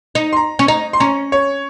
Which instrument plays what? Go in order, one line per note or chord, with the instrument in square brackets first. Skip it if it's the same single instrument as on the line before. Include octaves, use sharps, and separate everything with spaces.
[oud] D#4
[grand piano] C6
A#5
[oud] C#4
[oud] D#4 [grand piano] A#5
[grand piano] C6
[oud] C#4 [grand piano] A#5
[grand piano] C#5